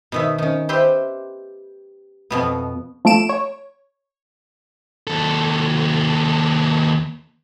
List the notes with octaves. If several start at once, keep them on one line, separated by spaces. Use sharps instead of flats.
B2 D#3 E5
D#3 C#4
G4 B4 C5 E5 G5
F2 B2 B3
F3 A3 A4 D7 E7
C#5
D#2 A4